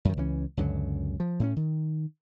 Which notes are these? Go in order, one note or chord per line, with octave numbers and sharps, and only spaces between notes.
F#2 D#3
C#2 E3 G#3 C#4
C#2 F#2 D3 F#3
F3
A2 C4 C#4
D#3